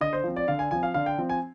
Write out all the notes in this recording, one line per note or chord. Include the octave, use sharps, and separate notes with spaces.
D3 D#5
C5
F3 C4
D5
D3 F5
G#5
F3 C4 G#5
F5
D3 F5
G5
F3 C4
G#5